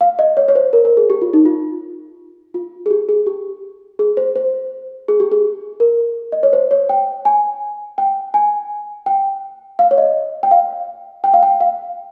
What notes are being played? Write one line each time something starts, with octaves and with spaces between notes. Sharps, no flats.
F5
D#5
C#5
C#5
C5
A#4
A#4
G#4
G4
F4
D#4
F4
F4
G#4
G4
G#4
G4
G#4
C5
C5
G#4
G4
G#4
A#4
D#5
C#5
C5
C#5
G5
G#5
G5
G#5
G5
F5
C#5
D#5
G5
F5
G5
F5
G5
F5